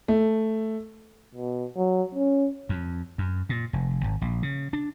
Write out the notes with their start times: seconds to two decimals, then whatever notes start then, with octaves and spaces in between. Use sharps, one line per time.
0.08 A3
1.35 B2
1.77 F#3
2.15 C#4
2.69 F2
3.18 F#2
3.49 A#2
3.73 F1
4.04 G#1
4.22 A#1
4.43 C#3
4.73 D4